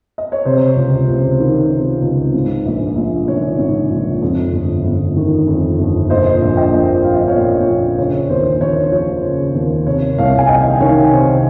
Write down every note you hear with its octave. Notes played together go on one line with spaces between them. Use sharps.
D#5
C#5
C3 C5
C#2
C#2
D#3
C3
C#2
G#2
A#1
A#1
D#3 C#5
G#2
A#1
F2
G1
G1
D#3
F2
G1
A#2 C5 D#5
A#1
D#5 G5
A#1
F3 F5
D#5
C#5 F5
A#2
A#1
C#3 C#5
D#2 C5
D#2 C#5
F3 C#5
C#3
D#2
C3 C#5
C2 C#5 F5
G#5
C2 D#5 G5
D#3 C#5 F5
C3 C5